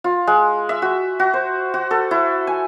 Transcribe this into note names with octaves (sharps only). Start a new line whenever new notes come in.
F4
G#3
E5
F#4
F#4
C5
F#4
A4
E4
G#5